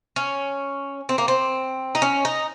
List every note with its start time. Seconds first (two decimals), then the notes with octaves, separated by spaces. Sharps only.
0.16 C#4
1.09 C4
1.18 A#3
1.28 C4
1.95 D#4
2.02 C#4
2.25 D#4